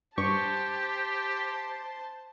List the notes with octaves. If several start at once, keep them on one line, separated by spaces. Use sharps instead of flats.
G2 G4 C5 A5 C#6